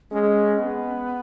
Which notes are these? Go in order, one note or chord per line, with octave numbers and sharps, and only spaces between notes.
G#3 C#4
B3